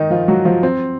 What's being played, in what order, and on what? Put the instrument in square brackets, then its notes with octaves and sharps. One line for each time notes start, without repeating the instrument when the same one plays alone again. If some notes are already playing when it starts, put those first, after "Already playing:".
Already playing: [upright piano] D#3 D#4
F3 F4
F#3 F#4
F3 F4
C4